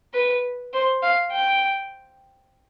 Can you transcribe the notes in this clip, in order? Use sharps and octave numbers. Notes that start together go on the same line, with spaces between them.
B4
C5
F5
G5